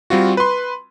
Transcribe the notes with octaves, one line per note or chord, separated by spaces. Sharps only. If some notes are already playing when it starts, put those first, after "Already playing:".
G3 C4 F4 F#4
B4 C6